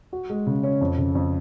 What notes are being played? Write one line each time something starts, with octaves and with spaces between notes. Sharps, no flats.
F#4
G#3
C#3
C#4
F2
C#3
F2